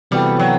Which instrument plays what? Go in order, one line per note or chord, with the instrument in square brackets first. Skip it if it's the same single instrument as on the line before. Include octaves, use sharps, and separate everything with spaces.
[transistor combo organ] C3 E3 B3 F#4 A4 [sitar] G3
[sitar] F#3